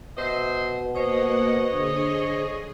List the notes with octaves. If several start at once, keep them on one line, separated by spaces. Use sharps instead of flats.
B2 C5 D#5 E5
A#3 C5 C#5 D#5 F#5
D3 G#4